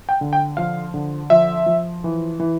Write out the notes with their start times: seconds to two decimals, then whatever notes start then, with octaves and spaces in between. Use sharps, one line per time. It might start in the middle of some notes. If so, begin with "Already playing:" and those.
0.09 G5
0.21 D3
0.33 G5
0.57 F3 F5
0.94 D3
1.30 F3 E5
1.66 F3
2.04 E3
2.40 E3